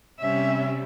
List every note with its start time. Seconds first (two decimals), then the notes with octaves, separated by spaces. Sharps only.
0.20 C3 G3 C#4 E5